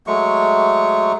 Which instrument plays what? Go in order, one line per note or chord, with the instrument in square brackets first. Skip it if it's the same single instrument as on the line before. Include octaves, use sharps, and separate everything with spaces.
[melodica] F#3 G#3 A3 C#6